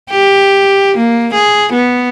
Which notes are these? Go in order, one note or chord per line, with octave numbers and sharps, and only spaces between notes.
G4
A#3
G#4
B3